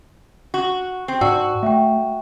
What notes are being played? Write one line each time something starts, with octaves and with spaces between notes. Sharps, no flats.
F#4
C4
G#2 F#4 D5 A5 E6
A3 E5 G5